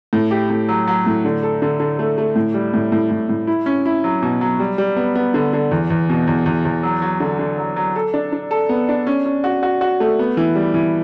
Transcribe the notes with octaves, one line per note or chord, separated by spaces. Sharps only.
A2
G4
A2
F#3
F#3
A2
D3
A4
D3
D3
A3
A3
A2
G3
A2
A2
A2
A2
E4
C#4
E4
F#3
B2
F#3
G3
G3
B3
B3
D3
D3
E2
E2
B2
E2
E2
E2
F#3
F#3
D3
D3
F#3
F#3
A4
D4
D4
A4
B3
D4
C#4
C#4
F#4
F#4
F#4
A3
B3
E3
G3
E3